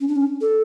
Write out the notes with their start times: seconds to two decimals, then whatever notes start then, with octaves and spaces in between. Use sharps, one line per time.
0.01 C#4
0.08 D4
0.16 C#4
0.41 A4